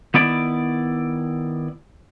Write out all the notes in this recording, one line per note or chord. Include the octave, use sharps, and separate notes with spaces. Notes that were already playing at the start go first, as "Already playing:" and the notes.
D#3 B3 E4 D5